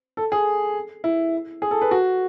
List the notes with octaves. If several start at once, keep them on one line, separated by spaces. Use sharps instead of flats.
A4
G#4
E4
G#4
A4
B4
F#4